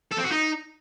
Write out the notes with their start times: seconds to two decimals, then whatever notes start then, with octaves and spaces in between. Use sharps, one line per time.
0.11 A4
0.18 C4
0.24 F#4
0.30 D#4